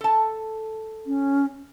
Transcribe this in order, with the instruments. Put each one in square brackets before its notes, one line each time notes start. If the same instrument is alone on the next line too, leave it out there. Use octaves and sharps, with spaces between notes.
[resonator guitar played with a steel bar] A4 A5
[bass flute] C#4